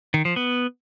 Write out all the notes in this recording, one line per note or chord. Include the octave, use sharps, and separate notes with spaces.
D#3
F3
B3